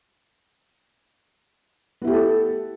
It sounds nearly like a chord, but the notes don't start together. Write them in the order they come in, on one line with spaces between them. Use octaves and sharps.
B3 E4 G4 A3 A4